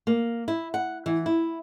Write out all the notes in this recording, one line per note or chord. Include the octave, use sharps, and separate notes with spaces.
A#3
E4
F#5
E3
E4